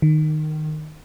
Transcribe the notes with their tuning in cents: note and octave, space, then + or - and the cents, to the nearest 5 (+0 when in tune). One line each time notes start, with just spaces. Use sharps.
D#3 -15